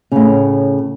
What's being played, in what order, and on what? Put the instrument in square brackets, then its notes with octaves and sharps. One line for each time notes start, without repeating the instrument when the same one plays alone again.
[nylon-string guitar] A2 C#3